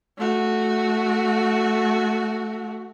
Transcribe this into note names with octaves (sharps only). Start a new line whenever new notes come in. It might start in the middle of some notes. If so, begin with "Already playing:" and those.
A3 F#4